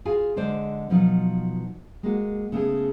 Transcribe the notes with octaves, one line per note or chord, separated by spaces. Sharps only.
F4 F#4 G#4 F5 G#5
D3 G#3 C5 D5
B2 F3 F#3 D#4 F4
G#3 A#3 F#4
C#3 A3 B3 G#4